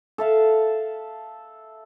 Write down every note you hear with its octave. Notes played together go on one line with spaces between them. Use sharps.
A4 E5 F5